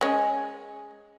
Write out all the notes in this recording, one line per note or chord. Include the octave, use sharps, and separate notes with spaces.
G#3 C#4